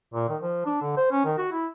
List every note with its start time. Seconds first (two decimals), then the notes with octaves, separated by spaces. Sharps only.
0.14 A#2
0.29 D#3
0.42 F3
0.66 D4
0.82 D3
0.97 C5
1.12 C#4
1.25 D#3
1.38 F#4
1.52 E4